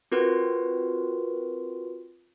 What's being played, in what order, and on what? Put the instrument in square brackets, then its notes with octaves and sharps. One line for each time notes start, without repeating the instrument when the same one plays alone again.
[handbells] C4 F4 F#4 A#4 B4